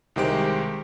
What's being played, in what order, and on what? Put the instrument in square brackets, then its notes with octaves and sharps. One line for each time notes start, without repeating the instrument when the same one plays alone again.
[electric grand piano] C2 D#3 G#3 G4 C5 D7